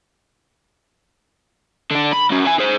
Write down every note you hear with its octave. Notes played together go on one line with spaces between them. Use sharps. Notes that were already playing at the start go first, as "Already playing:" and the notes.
D3 D4
B5
F#3 C#4
E5 G#5
G#4 C5